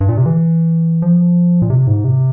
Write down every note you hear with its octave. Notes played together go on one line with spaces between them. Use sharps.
G2
A#2
C3
E3
F3
A#2
C3
G#2
C3